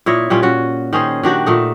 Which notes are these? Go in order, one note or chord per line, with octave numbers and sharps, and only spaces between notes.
A#2 E4 C#5 D#5
A#2 G3 C#4 F4
C#4 F#4
D#3 C#4 G#4 C5
D#3 D4 F#4 G4
A#2 A3 D#4